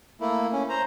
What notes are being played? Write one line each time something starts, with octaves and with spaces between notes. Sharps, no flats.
A3 A#3 E4
C#4
C5 A#5